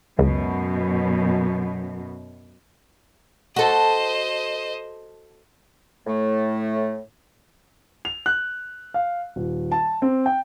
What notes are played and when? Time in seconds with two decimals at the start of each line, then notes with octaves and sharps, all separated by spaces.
0.19 C#2 F#2 B2
3.56 F#4 A4 C5 D#5
6.07 A2 A3
8.05 F7
8.26 F#6
8.94 F5
9.36 D#1
9.72 A5
10.02 C4
10.26 G5